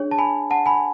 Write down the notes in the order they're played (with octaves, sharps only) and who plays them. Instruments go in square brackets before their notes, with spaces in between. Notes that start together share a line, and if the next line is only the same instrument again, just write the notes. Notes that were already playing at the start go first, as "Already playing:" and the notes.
Already playing: [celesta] D4 G#4 C#5
A5
G#5 B5
F#5 A5
G#5 B5